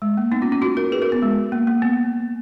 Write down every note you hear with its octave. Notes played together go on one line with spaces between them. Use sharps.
G#3
A#3
B3 D#4
C#4 F4
C#4 F4
D#4 F#4
F#4 A#4
G#4 B4
F#4 A#4
B3
G#3
A#3
A#3
B3